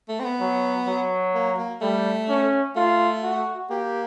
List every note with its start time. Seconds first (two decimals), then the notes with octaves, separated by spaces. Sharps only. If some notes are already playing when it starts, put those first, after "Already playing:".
0.09 A3
0.20 C4
0.24 B3
0.40 F#3
0.88 F#3
1.35 A#3
1.58 A#3
1.81 G3 A3
2.29 C#4
2.76 A3 F4
3.23 F#4
3.70 A#3 G4